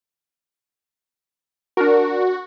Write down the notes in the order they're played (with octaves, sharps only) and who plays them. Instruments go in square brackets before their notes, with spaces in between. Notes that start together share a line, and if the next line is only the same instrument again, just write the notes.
[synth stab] D4 A#4 [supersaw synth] F#4